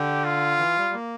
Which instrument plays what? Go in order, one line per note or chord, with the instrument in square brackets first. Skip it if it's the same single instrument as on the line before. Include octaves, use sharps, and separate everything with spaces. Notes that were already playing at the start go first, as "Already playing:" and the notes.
Already playing: [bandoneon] D3 [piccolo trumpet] G4
[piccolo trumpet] F4
[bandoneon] E3
G3
A#3